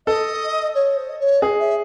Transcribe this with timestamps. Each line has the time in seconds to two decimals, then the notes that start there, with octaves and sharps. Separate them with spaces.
0.07 A4 D#5
0.75 C#5
0.97 C5
1.10 D#5
1.20 C#5
1.41 G#4 D#5
1.59 E5